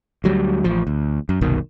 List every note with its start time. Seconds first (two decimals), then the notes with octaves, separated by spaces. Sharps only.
0.24 D2 F#3 G3
0.64 A1 F3
0.87 D2
1.29 F#2
1.41 F#1 C2 B2 D#3